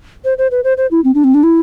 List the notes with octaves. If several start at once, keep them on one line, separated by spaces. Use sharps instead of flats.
C5
C5
B4
C5
C5
E4
C4
D4
C4
D4
E4